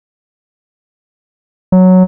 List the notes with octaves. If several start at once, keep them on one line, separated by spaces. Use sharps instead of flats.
F#3